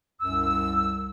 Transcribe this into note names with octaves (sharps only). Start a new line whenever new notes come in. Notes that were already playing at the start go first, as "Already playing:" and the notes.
C2 F#2 E6